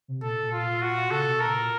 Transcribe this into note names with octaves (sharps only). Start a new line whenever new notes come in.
C3
A#2 A4
A#2
F4
F#4
C#3 A4
C3
A#2 A#4